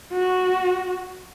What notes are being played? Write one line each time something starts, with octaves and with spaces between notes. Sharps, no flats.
F#4